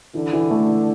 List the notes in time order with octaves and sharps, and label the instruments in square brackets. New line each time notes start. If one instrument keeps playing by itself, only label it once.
[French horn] D3 [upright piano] E3
[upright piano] E3
A3
E3